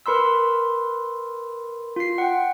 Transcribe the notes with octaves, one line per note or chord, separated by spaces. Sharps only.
A#4 B4 B5 C6 E6
F4 C7
F#5 G5